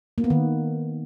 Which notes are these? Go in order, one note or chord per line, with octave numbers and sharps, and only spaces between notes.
A#3
B3
D#3